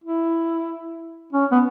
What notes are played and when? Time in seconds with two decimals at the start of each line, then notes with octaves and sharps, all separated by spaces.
0.04 E4
1.33 C#4
1.51 B3